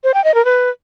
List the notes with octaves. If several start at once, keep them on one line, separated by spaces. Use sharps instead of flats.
C5
G5
D#5
A#4
B4